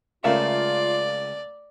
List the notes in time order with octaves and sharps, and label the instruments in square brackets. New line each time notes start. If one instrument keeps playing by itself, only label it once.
[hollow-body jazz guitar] C#2 C#3 E5 [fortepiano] A3 A#4 F5 [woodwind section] F4 [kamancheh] D5